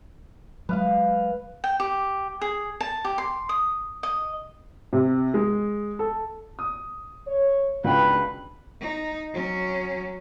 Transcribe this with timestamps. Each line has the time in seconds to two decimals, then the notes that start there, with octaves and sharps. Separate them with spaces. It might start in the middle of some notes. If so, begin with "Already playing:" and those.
0.69 F#3 G#3 B4 F5
1.64 G5
1.80 G4
2.41 G#4
2.80 A5
3.05 G4
3.18 C6
3.49 D#6
4.03 D#5
4.93 C3
5.34 G#3
5.99 A4
6.59 D#6
7.27 C#5
7.84 C#2 D#3 B3 D4 F#4 B4 G5
8.81 D#4
9.34 F#3 C#4